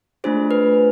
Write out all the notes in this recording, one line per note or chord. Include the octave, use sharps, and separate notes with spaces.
A3 D4 F4 G#4 C5
B4